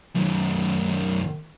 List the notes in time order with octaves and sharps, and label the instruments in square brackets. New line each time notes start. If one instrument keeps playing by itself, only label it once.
[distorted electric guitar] F#2 D#3